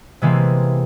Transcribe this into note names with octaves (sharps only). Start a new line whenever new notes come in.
C3 E3 G#3 A#3 C4